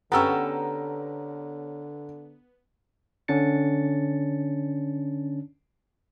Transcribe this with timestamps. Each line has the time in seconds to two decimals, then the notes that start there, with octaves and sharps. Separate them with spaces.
0.12 D3 B3 C#4 G4 A4 A#5 E6
3.28 D3 C#4 D4 A6 C#7